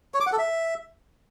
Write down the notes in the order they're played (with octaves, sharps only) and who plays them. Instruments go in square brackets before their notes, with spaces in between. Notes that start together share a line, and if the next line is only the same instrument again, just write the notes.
[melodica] C#5
D6
F#5
A4
E5